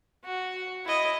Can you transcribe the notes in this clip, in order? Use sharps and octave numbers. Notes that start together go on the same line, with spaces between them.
F#4
E4 D#5